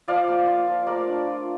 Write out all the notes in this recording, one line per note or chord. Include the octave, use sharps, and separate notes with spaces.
F3 D5 F5
A#3
F4
F3
A3 A#4 D5
D4
F4